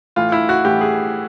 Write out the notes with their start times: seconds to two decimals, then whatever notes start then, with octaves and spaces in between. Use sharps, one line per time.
0.16 A2 E3 F4
0.32 E4
0.49 F#4
0.65 A2 E3 G4
0.81 G#4